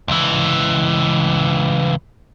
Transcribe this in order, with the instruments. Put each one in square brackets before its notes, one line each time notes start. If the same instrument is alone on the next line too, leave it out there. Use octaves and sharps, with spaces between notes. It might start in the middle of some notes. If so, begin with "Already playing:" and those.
[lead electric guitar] C#2 E3